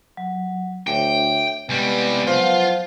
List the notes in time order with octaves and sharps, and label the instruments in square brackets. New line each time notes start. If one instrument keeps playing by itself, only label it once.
[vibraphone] F#3
[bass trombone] D2 [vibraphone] C#5 E5 D6 [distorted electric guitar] G5
[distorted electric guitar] C2 G3 [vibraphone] G#3 D#5 [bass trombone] B3
[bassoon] F3 [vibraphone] F#3 F#5 [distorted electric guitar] F4